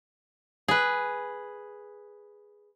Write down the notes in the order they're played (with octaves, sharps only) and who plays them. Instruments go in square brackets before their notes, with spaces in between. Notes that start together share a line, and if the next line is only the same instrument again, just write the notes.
[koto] G#4 B4